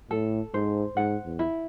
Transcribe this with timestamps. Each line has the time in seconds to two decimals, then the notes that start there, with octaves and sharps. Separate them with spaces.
0.11 A2 A4
0.54 G#2 C5
0.96 G#2 F#5
1.25 E2
1.39 E4